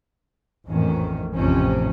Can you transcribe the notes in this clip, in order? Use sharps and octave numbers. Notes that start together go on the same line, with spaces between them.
A#1 F2 A2 D#3 E3 C#4
A1 F2 C3 F3 C#4